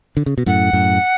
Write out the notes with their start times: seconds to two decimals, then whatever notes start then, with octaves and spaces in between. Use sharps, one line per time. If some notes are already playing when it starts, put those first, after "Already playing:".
0.17 D3
0.26 C#3
0.38 B2
0.46 F#2 A2 F#5
0.73 F#2 A2